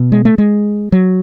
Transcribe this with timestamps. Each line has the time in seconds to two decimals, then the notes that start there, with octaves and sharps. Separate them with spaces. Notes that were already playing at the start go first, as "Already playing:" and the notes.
Already playing: B2
0.12 G#3
0.25 A3
0.38 G#3
0.92 F#3